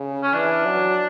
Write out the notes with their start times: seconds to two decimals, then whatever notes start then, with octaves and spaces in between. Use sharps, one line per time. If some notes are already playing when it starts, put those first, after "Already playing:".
Already playing: C#3
0.23 C#4
0.33 E3 D4
0.65 F#3